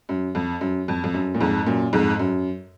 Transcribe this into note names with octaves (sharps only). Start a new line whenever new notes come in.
F#2
F2
F#2
F2
F2
F#2
A#2
F2 G#2
F#2 A#2
F2 G#2
F#2